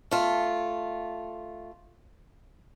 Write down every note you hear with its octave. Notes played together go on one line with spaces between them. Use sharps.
A3 F4